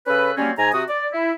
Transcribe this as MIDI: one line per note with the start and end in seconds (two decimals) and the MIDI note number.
0.07 0.32 49
0.07 0.32 61
0.07 0.32 69
0.07 0.32 71
0.37 0.52 54
0.37 0.52 55
0.37 0.52 58
0.37 0.52 60
0.37 0.52 61
0.58 0.72 44
0.58 0.72 80
0.58 0.72 82
0.73 0.84 48
0.73 0.84 66
0.73 0.84 87
0.89 1.08 74
1.13 1.32 64